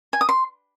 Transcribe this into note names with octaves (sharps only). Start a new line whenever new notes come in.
G#5
D#6
C6